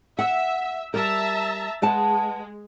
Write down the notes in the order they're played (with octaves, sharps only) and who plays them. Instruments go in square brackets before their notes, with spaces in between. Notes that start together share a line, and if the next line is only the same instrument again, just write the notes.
[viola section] E5 [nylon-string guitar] F#5
[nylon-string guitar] G3 A#4 [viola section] E5 A5 A#5
[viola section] G#3 [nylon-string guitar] B4 F#5 A5